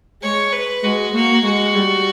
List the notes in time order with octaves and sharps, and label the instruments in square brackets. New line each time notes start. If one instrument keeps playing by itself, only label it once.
[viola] G#3 [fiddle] C#5
[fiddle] B4
[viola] G#3 [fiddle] F#4
[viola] A#3 [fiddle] F#4
[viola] G#3 [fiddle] F#4
[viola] G3